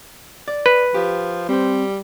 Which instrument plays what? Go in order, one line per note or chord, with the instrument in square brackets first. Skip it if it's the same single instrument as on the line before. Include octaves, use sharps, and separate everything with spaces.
[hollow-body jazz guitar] D5
[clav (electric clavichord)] B4
[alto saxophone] F3 [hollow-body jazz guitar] G4
[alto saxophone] G3 [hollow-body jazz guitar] C4 C5